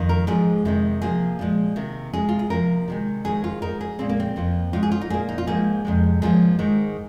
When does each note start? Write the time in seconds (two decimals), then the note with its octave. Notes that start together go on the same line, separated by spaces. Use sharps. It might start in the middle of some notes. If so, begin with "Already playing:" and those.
Already playing: F2 D#3
0.09 A#4
0.27 G#2 F3 G#3 G#4
0.65 F2 C3 D#3 G#3
1.02 C3 F3 A#3 G#4
1.39 A#2 F3 G#3
1.76 C3 D#3 A#3
2.13 C3 G#3 G#4
2.29 F4
2.39 G#4
2.50 C3 F3 A#3 A#4
2.88 C3 D#3 G#3
3.24 G#2 D#3 G#3 G#4
3.44 F4
3.62 G#2 G#3 A#4
3.81 G#4
3.99 A#2 G#3 C4
4.09 A#3
4.20 C4
4.36 F2 F3 A#3
4.73 G#2 G#3 F4
4.83 G#4
4.92 F4
5.01 D#4
5.10 A#2 A#3 G#4
5.29 D#4
5.38 F4
5.47 G#2 F3 A#3 G#4
5.85 F2 C3 G#3
6.22 G#2 F3 A#3 G#4
6.59 G#2 D#3 G#3